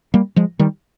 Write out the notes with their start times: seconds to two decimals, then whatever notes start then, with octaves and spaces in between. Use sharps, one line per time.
0.14 G3 A#3
0.36 F3 G#3
0.59 D#3 G3